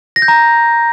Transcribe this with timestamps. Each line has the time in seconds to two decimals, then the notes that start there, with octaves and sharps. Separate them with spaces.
0.16 A#6
0.22 G6
0.28 A#5